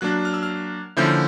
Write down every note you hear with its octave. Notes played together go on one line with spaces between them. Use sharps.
F#3 A#3 D4 F#6
F6
E6
F6
D3 F3 A#3 C#4 E4 G6